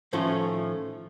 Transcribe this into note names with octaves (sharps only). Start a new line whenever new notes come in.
A2 D#3 F3 A3 C#4 F4